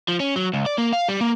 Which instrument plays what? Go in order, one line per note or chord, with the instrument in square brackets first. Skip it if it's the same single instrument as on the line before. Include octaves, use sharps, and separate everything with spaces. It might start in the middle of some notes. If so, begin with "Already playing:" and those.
[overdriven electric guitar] F3
C#4
F#3
C#2
D5
A#3
F5
G3
A#3